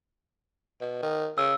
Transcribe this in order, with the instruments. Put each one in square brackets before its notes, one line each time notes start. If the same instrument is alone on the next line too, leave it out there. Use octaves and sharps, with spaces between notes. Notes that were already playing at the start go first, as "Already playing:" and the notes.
[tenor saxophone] B2
D#3
[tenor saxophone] C#3 [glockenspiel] E6